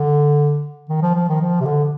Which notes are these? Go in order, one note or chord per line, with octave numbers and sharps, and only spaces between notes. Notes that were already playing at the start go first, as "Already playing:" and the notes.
Already playing: D3
D#3
F3
F3
D#3
F3
C3
D3